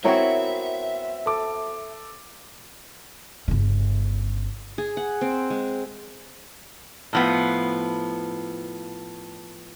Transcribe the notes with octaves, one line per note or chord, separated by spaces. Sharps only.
B3 C4 E4 F#4 A#4 C#5 E5
A4 D6
G1 C#3
G#4
F#5
C4
G#3
A2 F3 B3